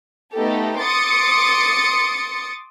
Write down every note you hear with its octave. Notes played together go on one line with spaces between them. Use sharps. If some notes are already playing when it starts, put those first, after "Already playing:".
A3 B3 D#4 G4 A4
C6 D6 D#6 A6 C#7